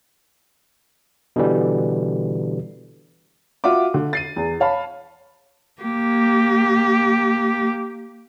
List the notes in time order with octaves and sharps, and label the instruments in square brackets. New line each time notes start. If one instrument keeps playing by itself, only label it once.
[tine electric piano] B2 D3 E3 G3
[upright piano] F4 F#4 E5 D6
D3
A6 C7 D#7
E2
C#5 F5 A5 B5
[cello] A#3 G4